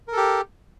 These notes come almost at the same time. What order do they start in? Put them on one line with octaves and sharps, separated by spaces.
A#4 A4 G4